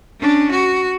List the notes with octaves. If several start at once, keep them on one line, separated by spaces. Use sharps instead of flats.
C#4 D4
F#4